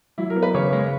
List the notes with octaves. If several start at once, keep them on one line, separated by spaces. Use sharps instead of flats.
F#3 E4
A#4
B3
B4
C#3 C#5
G#3